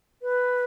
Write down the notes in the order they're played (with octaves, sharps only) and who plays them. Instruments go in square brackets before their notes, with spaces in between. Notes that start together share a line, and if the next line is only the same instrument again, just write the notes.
[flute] B4